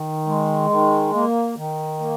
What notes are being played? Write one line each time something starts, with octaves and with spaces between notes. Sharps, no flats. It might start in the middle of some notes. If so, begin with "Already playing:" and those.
Already playing: D#3
G#3
D#3
A#3
D#3
A#3